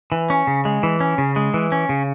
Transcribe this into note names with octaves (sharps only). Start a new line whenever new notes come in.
E3
C#4
C#3
G#3
E3
C#4
C#3
G#3
E3
C#4
C#3